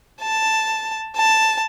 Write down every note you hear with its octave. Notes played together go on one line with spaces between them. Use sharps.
A5
A5